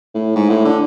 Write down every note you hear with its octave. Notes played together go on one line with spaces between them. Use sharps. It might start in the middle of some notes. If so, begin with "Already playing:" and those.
A2
G#2
A2
D3